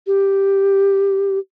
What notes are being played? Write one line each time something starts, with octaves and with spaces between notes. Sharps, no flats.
G4